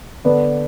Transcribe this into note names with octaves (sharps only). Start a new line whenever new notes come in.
D3 B3 D4 B4 D5